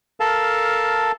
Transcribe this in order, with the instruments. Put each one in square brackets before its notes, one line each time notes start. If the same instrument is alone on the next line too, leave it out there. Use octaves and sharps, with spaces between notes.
[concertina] A4 A#4 F5 A5